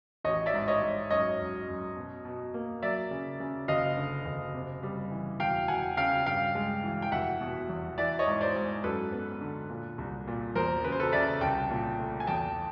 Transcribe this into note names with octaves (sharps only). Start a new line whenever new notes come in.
A1 C#5 D#5
D5 E5
G#2
C#5 D#5
G#2
F#2 C#5 D#5
F#2
F#2
B2
B2
A#3
F#3 D5 E5
C#3
C#3
F#1 D#5 F5
D3
F#1
C3
G3
E3
E1 F5 G5
E1 F#5 G#5
C#3 F5 G5
G2 F5 G5
G#3
E3
G5
F1 E5 F#5
B2
E2
E3 D5 E5
C#5 D#5
G#2
C5 D5
G#2
F#2 A4 B4
B3
D3
A#2
C2
A#2
E2 A#4 C5
C#3 B4
C5
A4 B4
C#3 D5 E5
C2 G5 A5
A#2
A3
G#5
E2 G5 A5